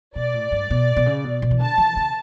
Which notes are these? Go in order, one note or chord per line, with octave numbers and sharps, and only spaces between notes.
B2 D5
A2
G2
B2
B2
C#3
B2
B2
E3
D3 A5
E3
C#3